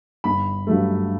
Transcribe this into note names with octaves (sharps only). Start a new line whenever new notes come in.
G1 B5
G2 F#3 A3